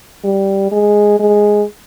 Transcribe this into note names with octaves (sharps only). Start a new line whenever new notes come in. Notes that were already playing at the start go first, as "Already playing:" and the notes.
G3
G#3
G#3